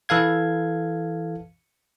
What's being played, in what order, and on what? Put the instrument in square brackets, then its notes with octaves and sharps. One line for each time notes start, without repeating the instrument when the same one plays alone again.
[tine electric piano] E3 A4 F5 G#6